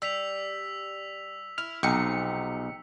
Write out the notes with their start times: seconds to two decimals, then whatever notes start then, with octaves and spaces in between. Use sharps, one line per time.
0.02 G3 E6 B6 F7
1.58 E4 F6
1.83 B1 C3 F3 D#4 G5 C#7